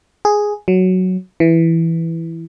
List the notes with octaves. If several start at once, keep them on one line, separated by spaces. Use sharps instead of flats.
G#4
F#3
E3